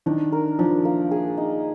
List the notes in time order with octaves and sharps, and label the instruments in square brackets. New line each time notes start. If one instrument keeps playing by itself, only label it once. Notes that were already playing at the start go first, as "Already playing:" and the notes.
[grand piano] D#3 [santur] D4
[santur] A#4
[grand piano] F3 [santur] D4
[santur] A#3
G#4
D#4